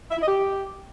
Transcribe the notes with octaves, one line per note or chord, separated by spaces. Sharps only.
E5
E4
D#5
G4